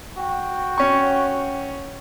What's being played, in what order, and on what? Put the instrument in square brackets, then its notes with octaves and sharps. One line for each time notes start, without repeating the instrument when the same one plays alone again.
[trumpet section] F#4 G5
[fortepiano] C#4 C#6